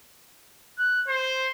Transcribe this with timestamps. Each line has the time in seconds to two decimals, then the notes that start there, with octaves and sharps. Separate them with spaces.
0.78 F#6
1.08 C5